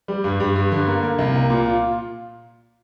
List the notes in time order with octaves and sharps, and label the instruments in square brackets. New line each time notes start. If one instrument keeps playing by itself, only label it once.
[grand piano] G3
G2
G2
G2
D3
A#3
A#3
C2
A#3
A#2
F4